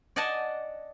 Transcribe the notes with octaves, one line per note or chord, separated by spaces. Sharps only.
D5 D#5 F#5 G#5 A5